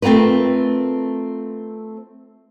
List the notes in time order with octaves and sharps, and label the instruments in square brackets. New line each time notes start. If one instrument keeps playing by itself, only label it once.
[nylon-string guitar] A3 C4 F4 A#4 B4